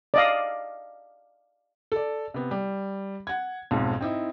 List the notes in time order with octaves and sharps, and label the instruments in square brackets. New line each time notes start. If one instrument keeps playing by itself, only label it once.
[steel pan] D5 D#5 F5
[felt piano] A4 D5
C3 B3
G3
F#5 G#6
B1 F2 G#2 B2
C4 D#4 E4